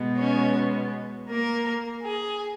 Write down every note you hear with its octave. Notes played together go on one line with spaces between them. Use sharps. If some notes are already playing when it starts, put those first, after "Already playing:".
Already playing: B2 G#3 B3
C#4 C#5
A#3 A#4
G#4